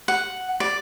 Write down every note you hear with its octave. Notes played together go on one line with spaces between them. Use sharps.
F#5
D5